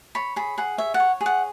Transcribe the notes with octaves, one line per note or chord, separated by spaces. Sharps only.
C#5 B5
G#4 B5
G#4 F#5
C#5 E5
F#5
C#5
G#4
F#5